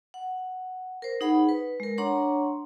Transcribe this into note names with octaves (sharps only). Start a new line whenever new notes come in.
F#5
A#4 C5
D#4 G#4 F#5 B5
B4
G#3 A#4
D4 C#5 F#5 A#5 C6 C#6